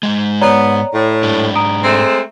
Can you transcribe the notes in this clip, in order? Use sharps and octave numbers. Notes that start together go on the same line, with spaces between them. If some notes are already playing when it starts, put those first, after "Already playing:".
G#2 C#3 G#3
B3 C#5 D5 A#5
A2
G#2 D4
A#5 D#6 D7
G#3 A3 C4